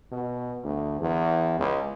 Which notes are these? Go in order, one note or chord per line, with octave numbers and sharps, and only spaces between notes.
B2
D2
E2
C#2